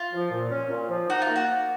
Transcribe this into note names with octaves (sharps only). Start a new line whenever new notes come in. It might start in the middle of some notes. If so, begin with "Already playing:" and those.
Already playing: F4
F3
A#2
C#4
A#2
F3
D#4 F#4
F4
A#3
F#4
A#3